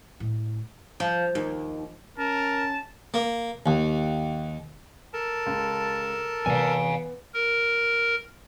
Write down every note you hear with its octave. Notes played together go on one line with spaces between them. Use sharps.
A2
F3
D#2
C#4 A#4 A5
A#3
D#2
A4 A#4 A5
C#2
C3 E3 B3 D5 F5 G#5
A#4